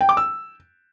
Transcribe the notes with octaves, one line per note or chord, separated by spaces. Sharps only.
G5
D6
E6